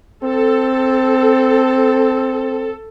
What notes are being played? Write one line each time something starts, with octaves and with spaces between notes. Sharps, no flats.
C4 A4